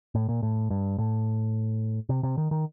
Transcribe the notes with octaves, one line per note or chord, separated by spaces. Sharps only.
A2
A#2
A2
G2
A2
C3
C3
D#3
D#3